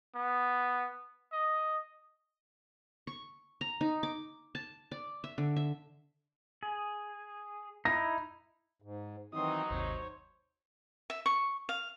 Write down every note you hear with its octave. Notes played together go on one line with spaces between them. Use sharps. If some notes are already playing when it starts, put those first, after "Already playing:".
B3
D#5
C#6
A#5
D#4
D6
A5
D5
E5
D3
E5
G#4
D#4 E4 A#6
G#2
D#3 E3 F#3 C4 D#4 C6 D#6
G#1 D#2 C3 C5 C#5
E5
C#6
F5